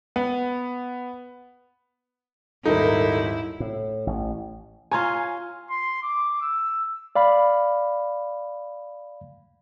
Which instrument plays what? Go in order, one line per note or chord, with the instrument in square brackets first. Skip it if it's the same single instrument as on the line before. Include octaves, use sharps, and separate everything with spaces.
[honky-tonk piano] B3
[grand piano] D#1 G#2 [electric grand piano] D#4 [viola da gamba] E4 [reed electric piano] A4 A#4
[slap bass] A2
A1
[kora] F4 C#5 [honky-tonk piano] G#5 A#5 G#6
[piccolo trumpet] C6
D6
E6
[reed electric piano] D5 F5 B5